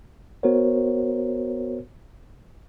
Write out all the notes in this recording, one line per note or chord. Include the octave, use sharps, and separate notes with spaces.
B3 F#4 A#4 C5 C#5